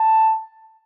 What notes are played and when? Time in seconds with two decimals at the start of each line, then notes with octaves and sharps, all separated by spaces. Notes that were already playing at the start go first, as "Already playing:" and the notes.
Already playing: A5